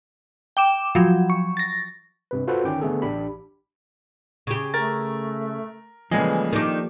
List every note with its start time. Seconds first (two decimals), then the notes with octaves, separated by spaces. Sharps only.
0.57 G5 D6 E7
0.95 F3 F#3
1.30 C#6
1.57 A6 A#6
2.31 G2 C3 B4
2.48 F4 F#4 A4 B4 C5 F#5
2.64 G1 D#3 C#4 G5 D6
2.81 D3 A3 B3 G#4 A4
3.02 A1 D4 G4 B5
4.47 C#3 G4
4.74 A3 A#4 A6
6.11 C#3 E3 F3 G3 G#3 A#3 G#4 A4
6.53 D#3 D4 G4